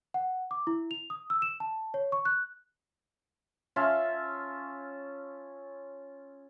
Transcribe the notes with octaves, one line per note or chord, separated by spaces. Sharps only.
F#5
D6
E4
F7
D#6
E6
E7
A5
C#5
C#6
F#6
C#4 F4 E5 A5